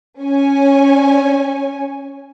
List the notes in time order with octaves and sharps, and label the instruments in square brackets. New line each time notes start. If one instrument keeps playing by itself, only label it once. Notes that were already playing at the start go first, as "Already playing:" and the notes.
[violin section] C#4 C#5 G#5